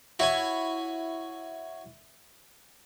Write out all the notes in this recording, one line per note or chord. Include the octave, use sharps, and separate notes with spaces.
E4 F#4 C#5 G#5